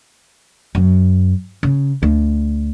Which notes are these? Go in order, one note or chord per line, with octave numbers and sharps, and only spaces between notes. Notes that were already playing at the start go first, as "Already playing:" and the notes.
F#2
C#3
D2